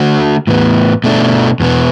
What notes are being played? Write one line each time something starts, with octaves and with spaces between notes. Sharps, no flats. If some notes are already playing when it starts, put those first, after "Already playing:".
Already playing: D3 A3 F#4
A2 E3 B3
B2 A3 D4
E2 B2 B3